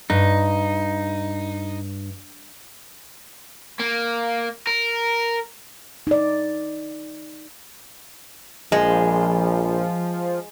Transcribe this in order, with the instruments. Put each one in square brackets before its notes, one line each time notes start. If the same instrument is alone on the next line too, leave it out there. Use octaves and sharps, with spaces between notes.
[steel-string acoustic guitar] G2 [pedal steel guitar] D#4
[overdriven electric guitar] A#3
A#4
[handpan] D#4 D5
[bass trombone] A#1 [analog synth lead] F3 [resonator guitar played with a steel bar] G#3